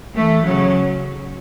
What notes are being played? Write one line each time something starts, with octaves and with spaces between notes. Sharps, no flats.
E3 A3
C#3 F#3